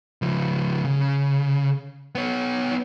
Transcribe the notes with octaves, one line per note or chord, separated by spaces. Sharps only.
C#3 F3
C#3
B3 C#5